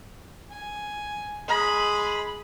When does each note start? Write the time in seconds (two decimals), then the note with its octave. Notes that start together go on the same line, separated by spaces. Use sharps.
0.51 G#5
1.49 G#3 G#4 D#5 B5